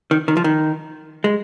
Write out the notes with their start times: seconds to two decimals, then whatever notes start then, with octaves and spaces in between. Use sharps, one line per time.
0.11 D#3
0.28 D#3
0.37 F3
0.44 D#3
1.24 G#3